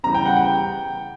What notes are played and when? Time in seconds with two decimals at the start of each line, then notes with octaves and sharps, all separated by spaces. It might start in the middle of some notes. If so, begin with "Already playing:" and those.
0.04 C#3 E3 G3 A#5
0.14 G5
0.25 F#5
0.37 G5